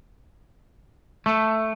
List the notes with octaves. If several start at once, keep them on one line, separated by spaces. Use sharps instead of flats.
A3